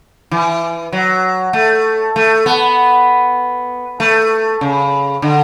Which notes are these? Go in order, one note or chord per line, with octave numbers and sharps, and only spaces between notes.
E3
F#3
A3
A3
B3
A3
C#3
D3